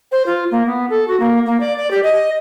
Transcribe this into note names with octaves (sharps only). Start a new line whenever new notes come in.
C5
F4
A#3
B3
A4
F#4
A#3
A#3
D5
D5
G4
D#5